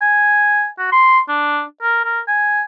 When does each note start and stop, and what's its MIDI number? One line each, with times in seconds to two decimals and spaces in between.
0.02 0.67 80
0.78 0.90 66
0.92 1.19 84
1.29 1.62 62
1.82 2.01 70
2.05 2.20 70
2.28 2.62 80